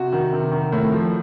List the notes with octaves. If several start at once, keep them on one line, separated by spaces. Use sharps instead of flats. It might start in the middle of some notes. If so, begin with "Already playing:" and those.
Already playing: C3 F#4
D#3
C3
D#3
A2
F3